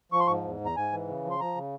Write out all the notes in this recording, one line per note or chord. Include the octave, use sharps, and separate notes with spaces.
F3 C#6
C6
G#2 C#6
E2
E2
A#5
G#2 G#5
E3
C#3
F3
C6
F3 A#5
C#3